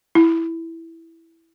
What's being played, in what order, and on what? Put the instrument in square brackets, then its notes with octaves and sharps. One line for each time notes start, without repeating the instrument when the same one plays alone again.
[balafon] E4